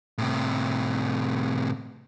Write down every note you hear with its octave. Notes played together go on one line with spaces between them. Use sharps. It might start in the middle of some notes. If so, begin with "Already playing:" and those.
A2 C3